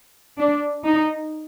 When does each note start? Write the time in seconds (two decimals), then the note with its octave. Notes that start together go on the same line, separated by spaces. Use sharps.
0.37 D4
0.85 D#4